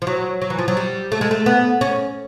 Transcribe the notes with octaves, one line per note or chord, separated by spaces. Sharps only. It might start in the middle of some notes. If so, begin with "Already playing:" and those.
F3
F#3
F#3
E3
F3
F#3
G3
A3
G#3
A3
B3
C#4